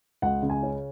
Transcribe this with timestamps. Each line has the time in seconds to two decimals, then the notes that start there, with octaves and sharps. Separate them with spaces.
0.22 C#2 F#5
0.43 C#3
0.50 G#5
0.63 C#4